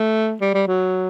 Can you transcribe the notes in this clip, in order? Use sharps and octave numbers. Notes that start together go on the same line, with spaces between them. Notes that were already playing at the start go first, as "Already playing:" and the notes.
Already playing: A3
G3
G3
F#3